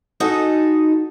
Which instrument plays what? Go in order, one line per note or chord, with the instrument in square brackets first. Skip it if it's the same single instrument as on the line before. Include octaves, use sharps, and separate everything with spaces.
[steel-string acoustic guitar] D#4 F#4 G#4 A4 D#5